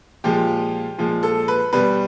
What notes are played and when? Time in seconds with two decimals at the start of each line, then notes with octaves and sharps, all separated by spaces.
0.24 A#2 F3 G#3 G4
0.98 A#2 F3 G#3
1.23 A4
1.48 B4
1.73 B2 G3 B4